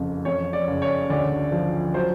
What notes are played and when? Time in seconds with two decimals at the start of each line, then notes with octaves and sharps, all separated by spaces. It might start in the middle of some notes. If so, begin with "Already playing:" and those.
Already playing: F#1 F2
0.25 F2 C#5
0.53 D5
0.68 F#1
0.82 C#5
1.10 D2 D5
1.52 F3
1.94 F#3 C5